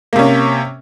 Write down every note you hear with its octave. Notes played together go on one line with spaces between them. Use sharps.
C3 A#3 C#4